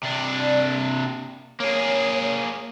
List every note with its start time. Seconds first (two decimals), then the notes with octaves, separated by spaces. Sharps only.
0.03 C3 D4
0.36 D5
0.67 A#3
1.60 A#3 G#4 C#5